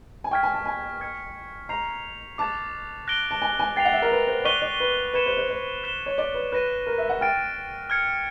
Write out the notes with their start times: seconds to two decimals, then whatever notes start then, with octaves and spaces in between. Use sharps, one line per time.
0.24 G#5
0.31 G5 C#6 F6 G#6 B6
0.43 G#5
0.54 A5
0.66 G#5
1.01 F6 G#6 C#7
1.69 A#5 G6 C7 F7
2.38 A5 D6 F#6 A6
3.08 F#6 A#6 D7 G7
3.31 A5
3.42 G#5
3.59 G#5
3.76 G5 A6 C7 F7
3.85 F#5
3.93 E5
4.02 A#4
4.11 B4
4.27 C5
4.45 D5 C#6 F#6 B6 D#7 G7
4.62 D5
4.80 B4
5.14 B4 G#6 C#7 E7
5.26 C5
5.37 C5
5.49 C5
5.84 F#6 B6 E7 G7
6.06 C#5
6.18 D5
6.34 B4
6.52 B4 F#6 A#6 D#7
6.87 A#4
6.98 E5
7.09 F#5
7.21 G5 F6 A6 D7
7.90 F6 G#6 C#7